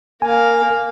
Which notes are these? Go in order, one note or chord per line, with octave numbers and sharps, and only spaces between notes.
A#3 F5 G#5